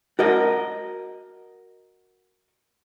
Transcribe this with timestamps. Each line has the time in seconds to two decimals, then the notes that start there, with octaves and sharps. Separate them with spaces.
0.19 F#4 A#4 D#5